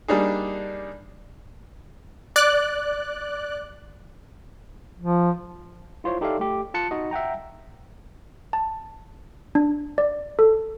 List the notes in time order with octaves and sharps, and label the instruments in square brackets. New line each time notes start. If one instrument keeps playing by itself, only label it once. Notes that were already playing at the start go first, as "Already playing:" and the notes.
[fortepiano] G3 A#3 D4 D#4 G#4
[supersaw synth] D5 F#6
[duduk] F3
[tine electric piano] E4 F4 C5 C#5
D#4 G4 A4 D5 E5 F5
A3 G4
F4 A5 F#6 C#7
D#4 F#4 D#5
E5 F#5 G5 A#5
[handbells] A5
D4
D5
A4